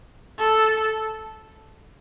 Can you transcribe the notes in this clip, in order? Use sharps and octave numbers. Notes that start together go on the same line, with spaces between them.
A4